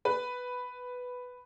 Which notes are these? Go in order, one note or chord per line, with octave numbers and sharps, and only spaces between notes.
B4